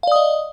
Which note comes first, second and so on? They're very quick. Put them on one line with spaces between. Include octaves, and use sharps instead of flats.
F5 D5 D#6 D#5